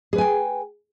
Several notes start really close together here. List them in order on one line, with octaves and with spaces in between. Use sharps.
G#4 B4 G#5 G5